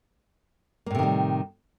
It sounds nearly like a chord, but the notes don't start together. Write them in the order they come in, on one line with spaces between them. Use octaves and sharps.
A#3 A2 C3 D#3 G3